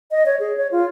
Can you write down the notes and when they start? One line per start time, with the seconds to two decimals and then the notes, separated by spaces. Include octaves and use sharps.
0.11 D#5
0.26 C#5
0.40 G#4
0.57 C#5
0.72 F4